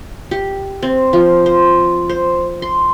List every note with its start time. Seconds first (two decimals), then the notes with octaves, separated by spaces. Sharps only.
0.31 G4
0.82 C4
1.13 F3
1.46 C5
2.09 C5
2.62 C6